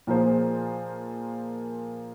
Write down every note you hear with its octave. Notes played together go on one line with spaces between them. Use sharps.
A#2 F3 A#3 G#4 C5